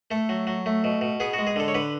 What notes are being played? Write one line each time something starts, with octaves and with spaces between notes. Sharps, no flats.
A3 A4
F#3
F#3
A3
B2
B2
B3 G#4
G#3 F#4
G#4
D3 A4
C#5
D3 B4